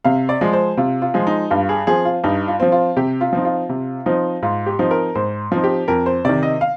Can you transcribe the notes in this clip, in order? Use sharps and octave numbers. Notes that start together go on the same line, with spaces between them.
C3 F5
D5
F3 G#3
C5
C3 F4
F4
F3 G#3
D#4
G2 F4
G#4
F3 C4 G#4
F4
G2 D#4
F4
F3 C4
F4
C3 G4
F4
F3 C4 D#4
F4
C3
F3 C4 D#4
G#2 F4
G4
F3 C4 D#4
A#4
G#2 C5
F3 C4 D#4
G4
F2 A#4
C5
C3 D#3 D5
D#5
F5